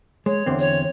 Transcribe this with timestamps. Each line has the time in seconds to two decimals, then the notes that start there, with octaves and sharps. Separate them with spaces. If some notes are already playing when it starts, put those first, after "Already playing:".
0.26 G#3 C#5
0.46 E2 D3 C4
0.59 C#5